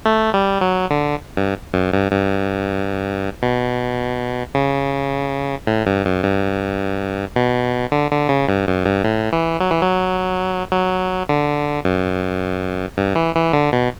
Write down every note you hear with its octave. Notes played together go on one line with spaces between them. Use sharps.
A3
G3
F#3
D3
G2
F#2
G2
G2
B2
C#3
A2
G2
F#2
G2
B2
D3
D3
C#3
G2
F#2
G2
A2
E3
F#3
E3
F#3
F#3
D3
F#2
G2
E3
E3
D3
B2